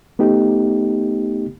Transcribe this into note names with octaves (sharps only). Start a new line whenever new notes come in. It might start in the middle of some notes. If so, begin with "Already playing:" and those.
A3 B3 D#4 G4